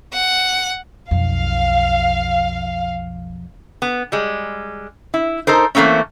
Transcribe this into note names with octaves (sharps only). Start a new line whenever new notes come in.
F#5
B1 F2 F5
B3
G3 G#3
E4
D#4 A4 A#4 C5
E3 A3 A#3 C4 C#4